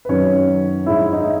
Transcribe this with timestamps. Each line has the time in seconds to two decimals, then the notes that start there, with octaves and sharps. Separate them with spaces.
0.05 B4
0.09 F#2 D#3 F#3 C#4 C#5
0.86 G#2 D#3 G#3 E4 E5
1.13 D#4 D#5